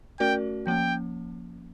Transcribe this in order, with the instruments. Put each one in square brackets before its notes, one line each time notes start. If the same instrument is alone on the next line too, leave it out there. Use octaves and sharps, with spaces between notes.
[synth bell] A3 C#4 F#4 A#4 D5 [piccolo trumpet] G5
[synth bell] F3 A#3 C#4 [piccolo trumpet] G5